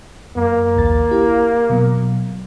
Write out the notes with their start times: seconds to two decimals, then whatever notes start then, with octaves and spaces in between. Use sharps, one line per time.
0.36 F#2 A#3
0.77 A#1 D#2 A6
1.11 E4 G4
1.70 B2 F#3